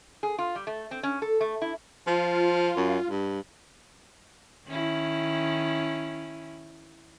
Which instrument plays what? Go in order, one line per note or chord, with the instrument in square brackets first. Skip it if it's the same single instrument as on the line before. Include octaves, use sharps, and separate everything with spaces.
[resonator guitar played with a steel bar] G#4
F4
G3
A3
C4
C#4
A4
A3
E4
[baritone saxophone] F3 [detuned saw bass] F4
[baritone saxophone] F#2
G2
[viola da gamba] D#3 C#4 E4